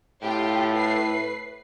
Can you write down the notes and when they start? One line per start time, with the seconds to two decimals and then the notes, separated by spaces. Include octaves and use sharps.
0.22 A2 F4 G4
0.75 B4 C7